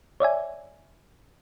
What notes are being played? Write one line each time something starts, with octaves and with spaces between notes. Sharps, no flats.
C#5 D5 E5 G#5